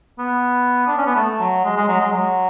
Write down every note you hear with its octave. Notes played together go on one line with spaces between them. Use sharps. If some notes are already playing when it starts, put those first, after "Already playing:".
B3
D4
C#4
B3
A3
F#3
G#3
G#3
F#3
G#3
F#3